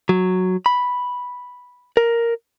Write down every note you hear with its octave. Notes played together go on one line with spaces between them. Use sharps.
F#3
B5
A#4